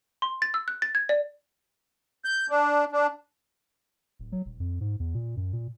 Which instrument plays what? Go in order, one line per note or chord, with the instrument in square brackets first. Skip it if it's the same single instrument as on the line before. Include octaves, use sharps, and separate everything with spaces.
[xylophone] C6
A6
E6
F#6
A6
G#6
D5
[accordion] G6
D4
D4
[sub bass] D1
F#3
D#1
F2
G#2
E2
A#2
F#2
A#2